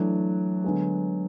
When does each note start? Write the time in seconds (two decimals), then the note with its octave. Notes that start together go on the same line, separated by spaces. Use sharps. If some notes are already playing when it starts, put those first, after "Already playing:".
Already playing: E3 F#3 A3 D4
0.64 D3 G#3 B3